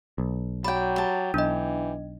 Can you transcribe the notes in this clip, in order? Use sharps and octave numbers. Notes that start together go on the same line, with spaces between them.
B1
F#3 D5 G5 B5
G4 A5
B1 E3 D4 D#5